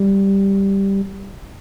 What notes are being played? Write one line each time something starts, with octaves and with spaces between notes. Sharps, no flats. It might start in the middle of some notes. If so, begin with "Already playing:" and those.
Already playing: G3